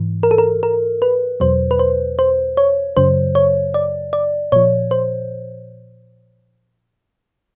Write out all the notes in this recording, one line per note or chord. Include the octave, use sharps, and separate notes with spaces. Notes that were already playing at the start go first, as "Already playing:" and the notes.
Already playing: G#2 E3
A#4
A4
A#4
A#4
B4
E2 B2 F#3 C5
B4
C5
C5
C#5
F#2 C#3 F#3 C5
C#5
D5
D5
A#2 F3 C#5
C5